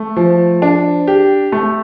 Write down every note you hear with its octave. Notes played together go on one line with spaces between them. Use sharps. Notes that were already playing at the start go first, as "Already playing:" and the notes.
Already playing: A3
F3
D4
G4
A3